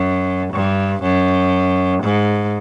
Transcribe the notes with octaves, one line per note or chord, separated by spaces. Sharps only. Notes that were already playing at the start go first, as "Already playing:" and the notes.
Already playing: F#2
G2
F#2
G#2